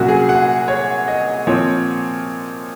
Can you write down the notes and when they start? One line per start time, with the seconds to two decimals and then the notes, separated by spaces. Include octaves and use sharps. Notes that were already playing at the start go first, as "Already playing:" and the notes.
Already playing: C2 A#2 F#3 C#4 F#4
0.08 G#4
0.29 F#5
0.68 C#5
1.08 D#5
1.47 A#2 F3 C4 C#5